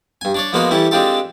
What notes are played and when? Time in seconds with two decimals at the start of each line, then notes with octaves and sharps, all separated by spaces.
0.21 G2 G#5
0.35 D4 C#5 D5
0.53 F3 G#3 A#3 B3 F4 F#4
0.71 E3 G3 C#4 E4 A4
0.91 G#3 C4 D4 F4 G4 A4